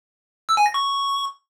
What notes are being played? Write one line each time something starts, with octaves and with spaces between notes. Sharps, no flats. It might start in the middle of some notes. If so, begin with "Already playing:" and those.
E6
G#5
A#6
C#6